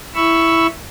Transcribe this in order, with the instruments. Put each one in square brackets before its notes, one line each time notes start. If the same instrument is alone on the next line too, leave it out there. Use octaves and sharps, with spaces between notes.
[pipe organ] E4 B5 C#6 E6